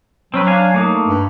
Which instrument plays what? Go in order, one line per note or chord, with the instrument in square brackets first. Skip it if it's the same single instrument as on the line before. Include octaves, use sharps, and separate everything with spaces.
[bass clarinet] F#3 [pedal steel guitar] C4 C#4 B4
[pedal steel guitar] D4 F5 G#5
A3 A#3 D#4
[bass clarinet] G2